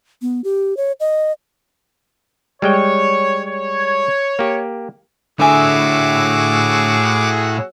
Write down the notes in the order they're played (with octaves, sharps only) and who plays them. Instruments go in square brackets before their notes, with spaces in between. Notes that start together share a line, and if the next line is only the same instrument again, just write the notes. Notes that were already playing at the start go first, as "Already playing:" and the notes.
[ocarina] B3
G4
C#5
D#5
[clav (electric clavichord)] G3 G#3 G5 [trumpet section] C#5
[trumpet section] C#5
[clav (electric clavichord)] A#3 G4
[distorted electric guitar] A2 E5 [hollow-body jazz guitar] D3 G#5 [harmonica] F#4 G#4 E6 [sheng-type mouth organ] D6